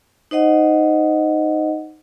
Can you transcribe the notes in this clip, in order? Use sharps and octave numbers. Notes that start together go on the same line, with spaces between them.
D#4 C5 D#5 F#5